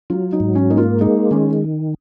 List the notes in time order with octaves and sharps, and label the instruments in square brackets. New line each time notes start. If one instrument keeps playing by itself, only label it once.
[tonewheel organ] F#3 [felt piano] F4
[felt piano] D#4
[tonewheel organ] G#2
[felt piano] C#4
[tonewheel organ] A#3 [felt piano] D#4
[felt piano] F4
[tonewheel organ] G#3 [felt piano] D#4
[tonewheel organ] D#3 [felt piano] C#4